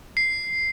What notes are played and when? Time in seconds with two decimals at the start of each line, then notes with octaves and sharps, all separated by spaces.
0.17 C7